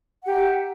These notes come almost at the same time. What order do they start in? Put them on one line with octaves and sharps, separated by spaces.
F#5 G4 A#5 E5